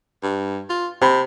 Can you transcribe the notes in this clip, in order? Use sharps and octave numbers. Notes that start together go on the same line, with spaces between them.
G2
F4
C3 B5